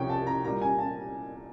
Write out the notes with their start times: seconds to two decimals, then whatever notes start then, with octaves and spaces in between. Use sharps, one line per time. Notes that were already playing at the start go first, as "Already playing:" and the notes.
Already playing: C2 C3 F3 C#5 G5
0.10 A5
0.27 A#5
0.44 A#2 G3 A#5
0.62 G#5
0.79 A5